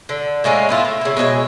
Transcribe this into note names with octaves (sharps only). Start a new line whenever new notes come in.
D3
A2 G#3 A#3 C#4
B3 E4 F4
A3
C#3 E4
B2 G#3 A4 C#5